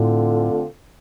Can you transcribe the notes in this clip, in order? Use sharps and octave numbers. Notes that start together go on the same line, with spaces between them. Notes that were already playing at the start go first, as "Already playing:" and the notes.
Already playing: A2 D3 A3 C4 F4 A4